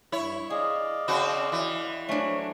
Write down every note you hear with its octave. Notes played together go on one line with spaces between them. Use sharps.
G2 E4 C#5
G#4 D5 D#5 F5
C#3 C4 F#4
E3
F#3 A3 C#4 D4